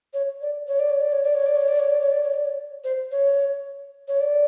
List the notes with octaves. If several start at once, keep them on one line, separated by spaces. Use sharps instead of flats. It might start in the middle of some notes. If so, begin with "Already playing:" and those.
C#5
D5
C#5
D5
C#5
D5
C#5
D5
C#5
D5
C#5
D5
C#5
D5
C#5
D5
C#5
D5
C#5
C5
C#5
C#5
D5